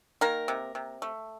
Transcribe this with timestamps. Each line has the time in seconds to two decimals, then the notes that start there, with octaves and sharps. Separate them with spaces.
0.21 D#3 A#3 A#4
0.48 C3
0.75 C3
1.02 A3